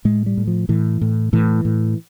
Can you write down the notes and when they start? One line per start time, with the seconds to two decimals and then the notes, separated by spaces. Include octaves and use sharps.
0.05 A2 G#3
0.26 G3
0.37 A2
0.47 F3
0.69 A2 E3
1.01 A2
1.33 A2 E3
1.65 A2